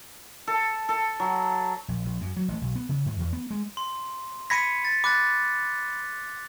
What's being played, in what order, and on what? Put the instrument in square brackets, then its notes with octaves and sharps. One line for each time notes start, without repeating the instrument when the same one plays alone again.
[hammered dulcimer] A4
A4
F#3
[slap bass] A#1
A#1
F#2
F#3
A1
B1
B3
C#3
G#2
E2
B3
G#3
[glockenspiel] C6
[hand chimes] B5 G#6 A#6 [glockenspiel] B6 C#7 D#7
[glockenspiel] A6
[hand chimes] B5 [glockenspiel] D6 F#6 A6